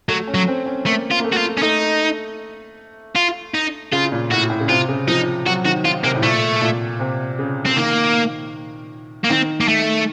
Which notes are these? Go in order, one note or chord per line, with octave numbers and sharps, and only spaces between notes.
F#3 A3
C#4
F#3
C4
C#4
A3 A#3
F4
A#3
A3
F#4
F4
C#4
A3 D#4
F4
D#4
C#3 F4
A#2
A2 F#4
A2
C#3
C3 F4
C#3
F3 D#4
F#3 F#4
D#3 F#4
D#3 F4
C3 A#3
A2
A#2 A3
A#2
C3
C#3
C#3 C4
D#3 A#3
A#3
D#3 C4
A#3
A3